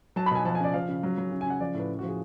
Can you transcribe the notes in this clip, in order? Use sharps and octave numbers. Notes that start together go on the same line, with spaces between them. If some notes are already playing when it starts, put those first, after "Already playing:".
F#3 A5
B5
B2 G#5
F3 A5
G#5
C#3 D5
F3 F5
C#3
F#3
F#3
C#3
G#5
C#3 F#5
F3 D5
A2
B4
C#3
F#4
F3
G#4